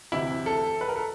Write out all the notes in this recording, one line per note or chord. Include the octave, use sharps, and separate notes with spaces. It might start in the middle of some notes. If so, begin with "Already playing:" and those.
D2 C3 E3 E4
A4
B4
A#4
A4